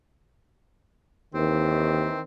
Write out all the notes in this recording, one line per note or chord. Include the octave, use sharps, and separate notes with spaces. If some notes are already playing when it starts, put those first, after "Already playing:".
D#2 D#3 E3 C4